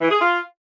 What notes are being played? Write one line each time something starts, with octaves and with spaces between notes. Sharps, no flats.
E3
G#4
F4